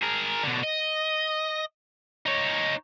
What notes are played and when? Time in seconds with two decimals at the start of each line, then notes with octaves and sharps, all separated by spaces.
0.02 G#4 A#4
0.43 B2 D3
0.63 D#5
2.26 D#4 C#5